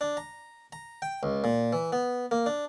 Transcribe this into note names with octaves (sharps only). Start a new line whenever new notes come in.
D4
A#5
A#5
G5
C#2
A#2
E3
B3
A#3
D4